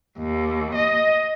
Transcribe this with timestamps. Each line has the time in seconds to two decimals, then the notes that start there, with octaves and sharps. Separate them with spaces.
0.19 D#2
0.75 D#5